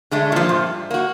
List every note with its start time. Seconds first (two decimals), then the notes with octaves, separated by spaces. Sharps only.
0.11 D3 G#3 A3
0.32 A#2 F3
0.49 G2
0.91 A#3 F#4